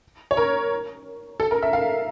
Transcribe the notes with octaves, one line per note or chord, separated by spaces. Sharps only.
C#5
A#4
A4
A#4
E5
F5